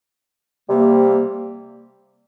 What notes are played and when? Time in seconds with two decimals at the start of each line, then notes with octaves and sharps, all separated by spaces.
0.69 C3 G3 A#3